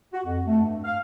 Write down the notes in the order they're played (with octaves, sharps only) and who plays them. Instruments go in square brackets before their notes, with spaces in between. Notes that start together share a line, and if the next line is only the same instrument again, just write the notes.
[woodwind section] F#4
F2
A3
G2
F5